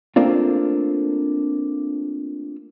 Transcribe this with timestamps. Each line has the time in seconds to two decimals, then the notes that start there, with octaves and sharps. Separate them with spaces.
0.16 A3 A#3 C4 D4 F4